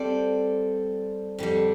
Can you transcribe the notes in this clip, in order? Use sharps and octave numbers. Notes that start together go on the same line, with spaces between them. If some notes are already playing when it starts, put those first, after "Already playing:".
Already playing: G3 C4 A4 D5
F2 D3 G3